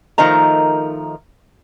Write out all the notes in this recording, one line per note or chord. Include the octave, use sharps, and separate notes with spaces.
D#3 F3 A3 D#4 A#4 A#5